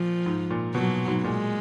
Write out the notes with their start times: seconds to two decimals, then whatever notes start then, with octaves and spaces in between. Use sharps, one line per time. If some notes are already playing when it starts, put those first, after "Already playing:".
Already playing: A#2 F3
0.26 G#2
0.51 A#2
0.75 B2 F#3
1.08 G#2
1.24 A#2 G#3